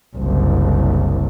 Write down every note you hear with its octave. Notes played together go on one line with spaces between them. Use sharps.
F#1 C2